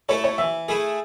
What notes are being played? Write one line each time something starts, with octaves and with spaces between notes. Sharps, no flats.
A3 E4 A4 C#5
C#5
E3 E5
A3 E4 G#4